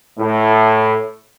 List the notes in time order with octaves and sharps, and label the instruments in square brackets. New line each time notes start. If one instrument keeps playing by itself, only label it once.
[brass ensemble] A2